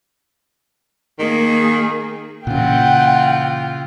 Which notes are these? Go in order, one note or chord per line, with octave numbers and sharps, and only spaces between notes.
D#3 A#3 G#4
A#2 C#3 E3 F4 F#5 G5